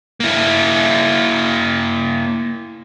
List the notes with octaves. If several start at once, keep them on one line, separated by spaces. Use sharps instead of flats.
A#3 E4